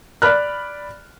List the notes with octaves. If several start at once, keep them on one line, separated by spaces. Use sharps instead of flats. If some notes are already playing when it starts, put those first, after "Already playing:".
D5 B5 F6 F#6